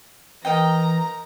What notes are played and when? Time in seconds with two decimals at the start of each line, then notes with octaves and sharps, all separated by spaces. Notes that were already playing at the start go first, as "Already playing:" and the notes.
0.45 E3 A#4 D#5 G5 A#5